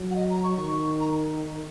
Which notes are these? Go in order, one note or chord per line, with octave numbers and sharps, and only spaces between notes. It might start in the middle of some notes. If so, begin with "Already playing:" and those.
Already playing: F#3
F#5
D#5
A#5
C#6
D#3
A#5